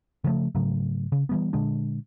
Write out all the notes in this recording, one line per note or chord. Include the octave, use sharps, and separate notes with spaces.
C#3 F3 G3 A3
G#2 C#3 F#3 A3
C#3
E3 G3 B3
A#2 D3 G#3 D4